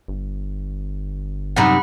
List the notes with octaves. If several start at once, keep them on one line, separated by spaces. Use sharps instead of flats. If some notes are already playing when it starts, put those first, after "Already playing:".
G1
F#2 C3 D#4 F#5 B5